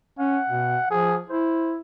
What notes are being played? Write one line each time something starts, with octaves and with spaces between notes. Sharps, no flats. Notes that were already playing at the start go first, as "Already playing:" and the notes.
C#4 F#5
B2
F3 G#4
E4 C5